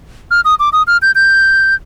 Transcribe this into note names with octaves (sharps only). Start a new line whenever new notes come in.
F6
D#6
D6
D#6
F6
G6
G6